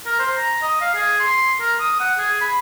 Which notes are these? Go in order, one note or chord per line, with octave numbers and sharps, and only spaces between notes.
A#4
C5
A#5
D#5
F5
G#4
C6
A#4
D#6
F#5
G#4
B5